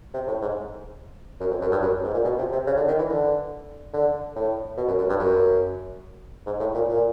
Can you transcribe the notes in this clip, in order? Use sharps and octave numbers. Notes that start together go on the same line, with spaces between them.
C3
A2
G#2
F#2
F2
F#2
G2
F#2
G#2
A#2
B2
C3
C3
C#3
D3
D#3
E3
D3
D3
A2
B2
F#2
F#2
G2
F#2
G#2
A2
A#2
A#2